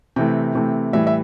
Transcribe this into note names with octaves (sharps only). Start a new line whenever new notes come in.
C3 E3 A3 G5
C3 E3 A3
A2 E3 G3 E5
E5